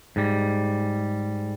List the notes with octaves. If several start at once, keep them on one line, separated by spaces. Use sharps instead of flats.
G#2 G3